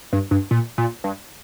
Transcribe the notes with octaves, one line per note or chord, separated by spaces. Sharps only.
G2
G2
A#2
A#2
G2